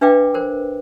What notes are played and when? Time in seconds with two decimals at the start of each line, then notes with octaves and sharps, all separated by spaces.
0.01 D4 B4 E5 F5 G5 D6
0.34 A#4 C5